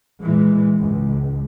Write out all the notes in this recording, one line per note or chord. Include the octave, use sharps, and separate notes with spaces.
A#2 E3 G#3
C#2 G#2